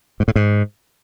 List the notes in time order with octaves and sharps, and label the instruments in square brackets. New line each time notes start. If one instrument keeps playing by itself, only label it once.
[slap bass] G#2
A2
G#2